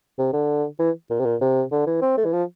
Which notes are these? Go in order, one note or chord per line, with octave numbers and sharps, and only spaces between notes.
C3
D3
E3
A#2
C3
A#2
C3
D3
E3
C4
A3
E3
F3